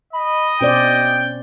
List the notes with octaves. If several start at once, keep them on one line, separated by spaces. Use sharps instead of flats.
D#5 B5
B2 C#4 C5 D5 G5